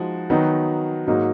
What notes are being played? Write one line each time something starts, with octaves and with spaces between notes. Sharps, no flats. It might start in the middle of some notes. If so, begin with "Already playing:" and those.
Already playing: F3 G#3 D#4 F#4
D#3 F#3 B3 D#4 F#4
G#2 F#3 A#3 D#4